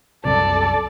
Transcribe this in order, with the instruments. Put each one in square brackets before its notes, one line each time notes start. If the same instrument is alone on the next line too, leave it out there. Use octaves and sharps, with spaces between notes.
[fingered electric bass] C2 F#2 C3 [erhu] A4 [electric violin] D5